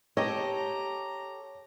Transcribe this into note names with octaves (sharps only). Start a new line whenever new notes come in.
G4 A4 C#5 D#5 A#5